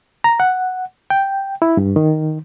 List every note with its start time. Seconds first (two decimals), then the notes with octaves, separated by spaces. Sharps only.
0.24 A#5
0.40 F#5
1.10 G5
1.62 E4
1.77 G2
1.96 D#3